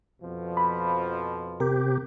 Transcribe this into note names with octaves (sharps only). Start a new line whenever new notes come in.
F2 B2 F3
B5
C3 G4 A#4